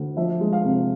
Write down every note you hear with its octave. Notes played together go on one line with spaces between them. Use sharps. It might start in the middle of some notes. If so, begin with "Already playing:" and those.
Already playing: D2
F3 E5
G#3
F5
C3